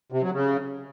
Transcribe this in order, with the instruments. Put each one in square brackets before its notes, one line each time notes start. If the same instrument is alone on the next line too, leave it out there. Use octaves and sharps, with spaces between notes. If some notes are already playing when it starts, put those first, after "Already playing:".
[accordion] C3
F#3
C#3